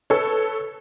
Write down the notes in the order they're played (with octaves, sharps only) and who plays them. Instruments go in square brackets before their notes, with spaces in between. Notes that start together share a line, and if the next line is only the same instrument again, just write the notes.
[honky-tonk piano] A4 B4 C#5